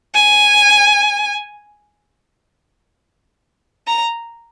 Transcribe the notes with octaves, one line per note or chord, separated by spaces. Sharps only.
G#5
A#5